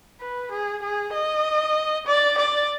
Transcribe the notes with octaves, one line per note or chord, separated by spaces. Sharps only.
B4
G#4
G#4
D#5
D5
D5